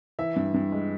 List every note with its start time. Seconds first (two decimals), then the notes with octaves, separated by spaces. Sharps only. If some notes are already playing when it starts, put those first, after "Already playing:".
0.19 E3 E5
0.36 G2
0.54 G2
0.72 G#3